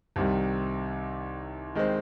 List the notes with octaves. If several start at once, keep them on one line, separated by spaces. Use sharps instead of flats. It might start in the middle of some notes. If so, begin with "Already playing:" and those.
C2 C3 D#3 G3
D#3 G#3 C4